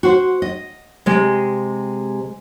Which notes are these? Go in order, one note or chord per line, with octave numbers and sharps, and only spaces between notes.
F#4 C5
D#5
C3 G#3